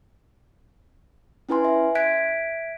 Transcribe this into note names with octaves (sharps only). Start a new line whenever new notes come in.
C#4 E4 B4 G#5 C6
E5
E5 F#6 G#6 B6 D7